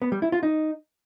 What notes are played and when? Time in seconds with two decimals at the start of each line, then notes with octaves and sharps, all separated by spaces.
0.02 B3
0.12 G3
0.22 E4
0.32 F4
0.43 D#4